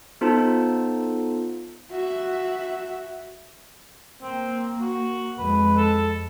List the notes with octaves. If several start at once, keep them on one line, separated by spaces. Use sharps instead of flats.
B3 D#4 F4 A4 C5 A5
F#4 E5
A#3 C4
F#4
F2 G#3 B4
A4